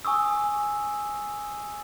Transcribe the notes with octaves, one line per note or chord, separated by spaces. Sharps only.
G#5 C#6 D#6 E6